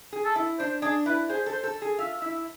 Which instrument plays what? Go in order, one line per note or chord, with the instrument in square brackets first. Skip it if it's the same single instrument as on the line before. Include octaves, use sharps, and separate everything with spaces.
[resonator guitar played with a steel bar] G#4
[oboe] A4
[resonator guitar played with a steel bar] E4
[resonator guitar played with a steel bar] D4 [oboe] C5
[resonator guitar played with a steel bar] D4 [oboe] G#4
[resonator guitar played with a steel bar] E4 [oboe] B4
[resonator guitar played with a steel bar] G#4 [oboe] C5
[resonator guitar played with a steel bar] A4
[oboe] C5
[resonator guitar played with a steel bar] A4
G#4
[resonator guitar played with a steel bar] F4 [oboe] E5
[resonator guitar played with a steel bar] E4 [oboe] E5